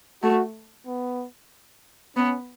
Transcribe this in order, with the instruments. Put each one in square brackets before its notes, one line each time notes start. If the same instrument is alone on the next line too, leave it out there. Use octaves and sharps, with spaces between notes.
[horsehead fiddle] A3 [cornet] F#4
[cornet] B3
[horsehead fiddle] B3 [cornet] C#4